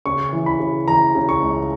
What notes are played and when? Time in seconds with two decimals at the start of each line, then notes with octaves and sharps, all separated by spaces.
0.06 C#3 C#6
0.33 E3
0.46 B5
0.60 C#3
0.87 E3 A#5
1.15 C#3
1.29 C#6
1.42 C#2